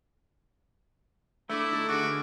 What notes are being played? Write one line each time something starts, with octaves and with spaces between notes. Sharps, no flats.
A3 D4 E4 A4 D6 E6
D#4 A4 E5
D3 D4 F#4 G#4 D6 D7
A#4 B4 F6